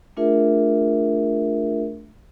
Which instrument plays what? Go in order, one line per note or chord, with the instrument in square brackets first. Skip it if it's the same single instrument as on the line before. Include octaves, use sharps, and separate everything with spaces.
[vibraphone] A3 D4 F4 G#4 A#4 E5